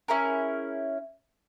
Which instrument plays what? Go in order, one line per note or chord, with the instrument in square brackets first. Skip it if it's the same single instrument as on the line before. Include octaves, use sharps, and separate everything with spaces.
[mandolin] C#4 E4 G#4 A#4